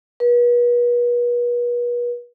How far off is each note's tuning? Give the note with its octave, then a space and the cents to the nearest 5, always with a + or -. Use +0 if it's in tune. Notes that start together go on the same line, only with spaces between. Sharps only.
B4 -40